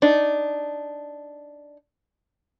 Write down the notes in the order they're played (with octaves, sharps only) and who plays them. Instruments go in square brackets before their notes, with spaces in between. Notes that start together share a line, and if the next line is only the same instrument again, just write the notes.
[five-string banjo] D4 D#4